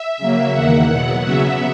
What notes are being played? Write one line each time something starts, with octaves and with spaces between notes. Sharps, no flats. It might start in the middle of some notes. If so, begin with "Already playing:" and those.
Already playing: E5
C#3 F#3 A#3
E2 D#3 A#3 F#5
B2 F#3 B3 F#5
C#3 F#3 B3 E5